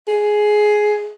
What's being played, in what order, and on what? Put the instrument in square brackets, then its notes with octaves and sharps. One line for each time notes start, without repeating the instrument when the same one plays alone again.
[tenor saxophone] G#4